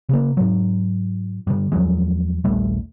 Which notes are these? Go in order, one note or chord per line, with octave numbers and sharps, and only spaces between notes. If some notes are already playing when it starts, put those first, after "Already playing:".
C#3 A#3
G#2 F#3
G2 D3
E2 F3 F#3 G#3
D#1 A#1 G3 A3